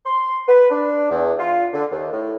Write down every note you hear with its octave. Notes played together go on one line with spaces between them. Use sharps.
C6
B4
D4
E2
F4
D3
D#2
A2